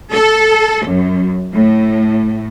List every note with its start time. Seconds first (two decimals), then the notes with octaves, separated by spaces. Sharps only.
0.12 A4
0.86 F#2
1.53 A2